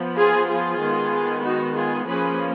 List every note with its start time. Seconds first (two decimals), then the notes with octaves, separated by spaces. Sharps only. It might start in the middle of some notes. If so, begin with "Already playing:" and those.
Already playing: F3 B3
0.17 F4 G#4
0.49 F4 G#4
0.80 D#3 G#3 B3
1.44 D#4 F#4
1.75 F4 G#4
2.07 F3 A#3 C#4 G#4 B4